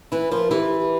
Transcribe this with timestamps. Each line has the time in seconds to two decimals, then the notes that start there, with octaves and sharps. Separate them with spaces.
0.12 E3 E4 B4
0.31 F3 F4 A#4
0.51 E3 E4 G4
0.80 G4